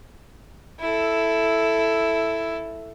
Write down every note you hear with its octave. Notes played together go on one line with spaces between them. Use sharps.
E4 A4